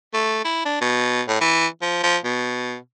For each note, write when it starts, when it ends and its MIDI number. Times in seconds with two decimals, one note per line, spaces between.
0.14 0.40 57
0.45 0.64 64
0.65 0.80 62
0.81 1.22 47
1.28 1.38 45
1.41 1.67 52
1.82 2.03 53
2.03 2.17 53
2.24 2.76 47